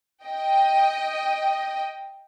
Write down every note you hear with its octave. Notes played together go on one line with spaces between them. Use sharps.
D#5 G5